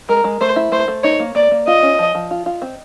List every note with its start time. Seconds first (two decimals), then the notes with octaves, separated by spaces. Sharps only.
0.09 G#3 A#4
0.24 G#3
0.41 A3 C5
0.56 E4
0.72 A3 C5
0.88 A3
1.03 D#4 C#5
1.20 A#3
1.35 A#3 D5
1.51 A#3
1.67 F4 D#5
1.83 C#4
1.99 F3
2.15 F3
2.31 F4
2.46 F4
2.62 C4